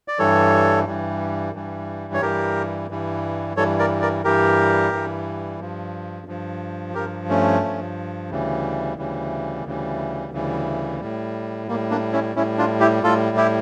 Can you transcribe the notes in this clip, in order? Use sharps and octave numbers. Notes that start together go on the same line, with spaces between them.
D5
G2 E3 G3 A4 C#5
G2 E3 G3
G2 E3 G3
C#5
G2 E3 G3 G4 A#4
G2 E3 G3
G2 E3 G3 A4 C#5
A#4 D5
A#4 D5
G2 E3 G3 G4 A#4
G2 E3 G3
G2 F3
G2 F3
G2 F3 G4 A#4
A3 C#4
G2 F3
D2 C#3 E3 G3
D2 C#3 E3 G3
D2 C#3 E3 G3
D2 C#3 E3 G3
A2 G3
A2 G3 A#3
A#3 D4
C#4 E4
A2 G3 C#4 E4
D4 F4
E4 G4
A2 G3 F4 A4
E4 G4